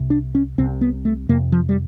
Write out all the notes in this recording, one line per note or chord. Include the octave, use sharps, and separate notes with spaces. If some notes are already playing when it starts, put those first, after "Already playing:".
Already playing: C2 C3
D4
C#4
C2 C3 C4
B3
A3
F2 C3 A#3
F3
G3